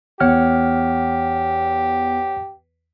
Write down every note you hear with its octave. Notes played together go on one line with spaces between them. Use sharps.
E2 G4 C#5 F#5 F6